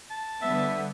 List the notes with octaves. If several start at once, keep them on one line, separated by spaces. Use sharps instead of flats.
A5
D3 G3 B3 E5